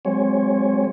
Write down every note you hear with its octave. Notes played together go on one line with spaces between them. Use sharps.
F#3 G#3 C4 C#5